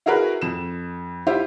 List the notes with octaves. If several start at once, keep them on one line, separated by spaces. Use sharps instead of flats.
E4 F#4 G#4 A#4 B4
F2 E7
E4 F4 G4 C5